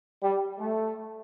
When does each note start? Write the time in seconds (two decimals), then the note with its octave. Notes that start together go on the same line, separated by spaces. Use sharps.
0.23 G3
0.59 A3